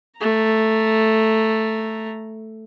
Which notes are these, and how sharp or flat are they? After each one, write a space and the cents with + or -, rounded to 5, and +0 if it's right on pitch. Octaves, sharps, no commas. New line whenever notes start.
A3 +0 A#5 +0